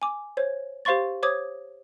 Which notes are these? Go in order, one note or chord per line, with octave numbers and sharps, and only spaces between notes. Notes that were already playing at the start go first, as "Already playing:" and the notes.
G#5 D6
C5 C#5
G4 C5 F5 C6 C#6 A6
C5 C#5 D6 D#6 G#6